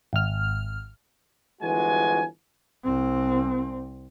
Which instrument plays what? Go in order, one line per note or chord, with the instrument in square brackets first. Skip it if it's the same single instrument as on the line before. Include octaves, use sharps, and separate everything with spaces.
[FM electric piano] G#1 F6
[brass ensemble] G1 E3 F3 G#3 F#4 G#5
[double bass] C2 C4